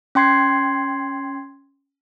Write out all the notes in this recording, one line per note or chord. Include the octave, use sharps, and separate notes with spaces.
C#4 G5 C6 G#6 C7